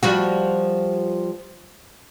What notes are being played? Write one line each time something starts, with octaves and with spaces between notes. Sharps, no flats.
F3 G3 F#4